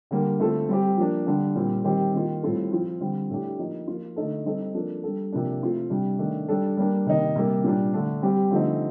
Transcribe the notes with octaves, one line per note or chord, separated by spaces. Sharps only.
D3 G3 A#3
D3 A3 C4 F4 A4
G3 C4 G4
F3 A#3 D4
D3 G3 D4
A#2 G3 C4
D#3 G3 C4 G4
D#3 A#3 F4
A2 G3 C4 F4 A4
F3 C4 F4
D3 G3 C4
A2 A3 D4 G4
F3 A#3 D#4
F3 A#3 F4
D3 A3 D#4 A4
G3 C4 D#4 A4
F3 A#3 D4 A4
G3 D4 A4
C3 F3 A#3 D4
F3 A3 C4 F4 A4
C3 G3 D4
D#3 A3 D4
G3 D4 A4
G3 A#3 D4
C3 D#3 A#3 D#4
C3 G3 A#3
A#2 G3 D4
D3 A3 D4
G3 C4 G4
D3 F3 A3 C4 D#4